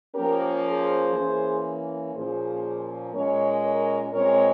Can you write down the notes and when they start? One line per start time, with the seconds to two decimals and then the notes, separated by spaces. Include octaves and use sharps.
0.14 F3 A#3 C#4 G4 A#4
0.64 G#4 C5
1.14 E3 A#3 C#4
2.14 A#2 F3 A#3 C#4 G#4 C5
3.13 A#2 G#3 C#4 A#4 C#5
3.64 A#4 C#5
4.13 A#2 G#3 C4 A#4 C#5